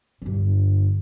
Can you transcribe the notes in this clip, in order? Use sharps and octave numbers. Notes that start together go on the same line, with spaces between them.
G2 D3